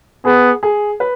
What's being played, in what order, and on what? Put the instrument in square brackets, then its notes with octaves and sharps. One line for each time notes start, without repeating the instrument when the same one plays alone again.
[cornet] B3 [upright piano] G#4
[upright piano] G#4
B4